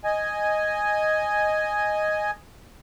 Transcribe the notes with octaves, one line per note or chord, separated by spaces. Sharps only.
D#5 G#5